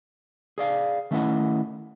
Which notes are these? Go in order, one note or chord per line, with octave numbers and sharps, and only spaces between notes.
G#4 D5 F5
D#3 A3 C#4 E4 D#5 F#5